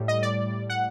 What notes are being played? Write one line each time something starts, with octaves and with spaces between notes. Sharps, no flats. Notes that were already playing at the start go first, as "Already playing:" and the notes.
Already playing: A2 G3
D#5
D5
F#5